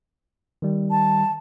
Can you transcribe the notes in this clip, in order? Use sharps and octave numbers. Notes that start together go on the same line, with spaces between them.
D#3 G3
A5